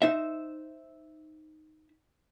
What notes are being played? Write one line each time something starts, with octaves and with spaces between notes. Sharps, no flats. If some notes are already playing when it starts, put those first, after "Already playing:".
D#4 C5 E5